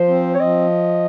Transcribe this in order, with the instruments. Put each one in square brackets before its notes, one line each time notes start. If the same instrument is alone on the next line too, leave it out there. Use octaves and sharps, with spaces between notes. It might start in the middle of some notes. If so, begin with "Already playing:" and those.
Already playing: [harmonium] F3 [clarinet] C5
[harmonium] C4
[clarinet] C#5
[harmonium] F3 [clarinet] D#5